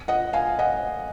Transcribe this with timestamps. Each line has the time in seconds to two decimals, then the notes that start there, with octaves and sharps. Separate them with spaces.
0.08 D#5 F#5
0.33 F5 G#5
0.59 D#5 F#5